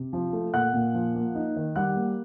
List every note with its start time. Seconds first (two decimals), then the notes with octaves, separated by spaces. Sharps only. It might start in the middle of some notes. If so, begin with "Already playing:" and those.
Already playing: C3
0.13 F3
0.33 A3
0.54 A#2 F#5 F#6
0.74 A#2
0.94 F3
1.15 A#3
1.35 D#4
1.56 D#3
1.76 G3 F#5 F#6
1.96 A#3